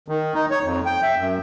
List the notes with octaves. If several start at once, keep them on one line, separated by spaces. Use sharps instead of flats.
D#3
D#4
C#5
F2
G5
E5
F#2